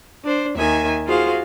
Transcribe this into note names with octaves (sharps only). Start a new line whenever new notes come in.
D4 C5
D#2 D#3 E5 G#5
F4 F#4 G#4 C5 F5